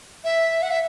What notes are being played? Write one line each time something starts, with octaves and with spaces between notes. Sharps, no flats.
E5
F#5
E5